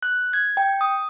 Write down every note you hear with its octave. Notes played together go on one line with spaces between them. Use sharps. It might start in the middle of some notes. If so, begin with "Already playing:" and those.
F#6
G#6
G5
D#6